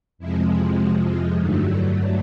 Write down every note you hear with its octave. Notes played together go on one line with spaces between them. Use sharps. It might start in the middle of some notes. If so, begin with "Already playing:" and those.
F2 C3 F3 G#3 E4
E4
F#4
F4
G2 D3 F#3 A3 D#4
E4